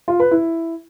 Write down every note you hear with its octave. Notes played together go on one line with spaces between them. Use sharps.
F4
B4
E4